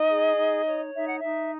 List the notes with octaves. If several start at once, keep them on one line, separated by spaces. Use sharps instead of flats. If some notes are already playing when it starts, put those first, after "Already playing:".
Already playing: D#4 D#5
G#4
D#4
C#5
D#4 E5
F#5
D#4 E5